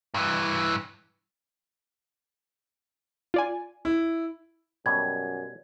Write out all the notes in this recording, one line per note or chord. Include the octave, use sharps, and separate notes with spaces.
G2 E3
F4 D5 G#5
E4
F#2 B2 G3 G#6